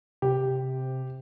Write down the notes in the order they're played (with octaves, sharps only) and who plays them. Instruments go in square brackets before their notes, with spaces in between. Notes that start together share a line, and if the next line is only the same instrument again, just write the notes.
[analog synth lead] C3 [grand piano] G4